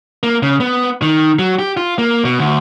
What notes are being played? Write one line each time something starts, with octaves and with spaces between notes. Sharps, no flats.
A#3
C#3
B3
D#3
F#3
G4
F4
A#3
B2
D2